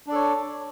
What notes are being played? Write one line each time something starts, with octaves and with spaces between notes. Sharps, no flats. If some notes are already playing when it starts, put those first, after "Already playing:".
D4 A4 C#5 D5